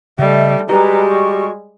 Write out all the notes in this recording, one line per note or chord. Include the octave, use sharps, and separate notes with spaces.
C#3 G3 A3 D#5 E5
G3 G#3 F#4 G4 B4 D#5 A#5
C#6